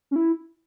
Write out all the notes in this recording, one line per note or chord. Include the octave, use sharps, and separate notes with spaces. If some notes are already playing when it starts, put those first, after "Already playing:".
C#4
E4